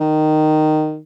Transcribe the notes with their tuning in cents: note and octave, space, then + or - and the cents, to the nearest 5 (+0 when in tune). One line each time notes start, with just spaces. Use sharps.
D#3 -10